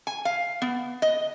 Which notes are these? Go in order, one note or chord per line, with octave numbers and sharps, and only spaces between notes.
G#5
F5
B3
D#5